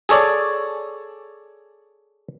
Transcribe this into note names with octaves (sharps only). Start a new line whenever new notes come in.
G#4 A4 C#5 D5